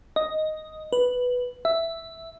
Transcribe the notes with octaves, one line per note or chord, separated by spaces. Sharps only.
D#5
B4
E5